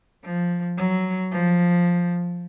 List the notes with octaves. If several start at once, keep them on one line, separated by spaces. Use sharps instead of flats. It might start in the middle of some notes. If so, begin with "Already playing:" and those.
F3
F#3
F3